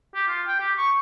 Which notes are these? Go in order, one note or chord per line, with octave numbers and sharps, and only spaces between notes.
G4
F4
G5
G4
C#6